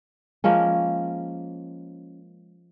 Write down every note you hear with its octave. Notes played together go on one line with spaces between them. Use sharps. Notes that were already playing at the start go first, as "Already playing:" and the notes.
F3 G#3 A#3 C#4